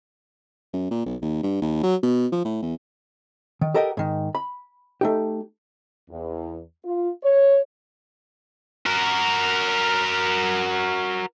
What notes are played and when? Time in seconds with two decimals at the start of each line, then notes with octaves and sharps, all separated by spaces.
0.73 F#2
0.91 A#2
1.06 B1
1.22 D#2
1.43 G2
1.62 D#2
1.83 F#3
2.03 B2
2.32 F3
2.45 A2
2.62 E2
3.61 D#3
3.74 G4 A4 A#4 D#5 F#5 G5
3.97 G#2 D#3
4.35 B5
5.01 A3 D#4 G4
6.10 E2
6.84 F4
7.24 C#5
8.86 F#4 A#4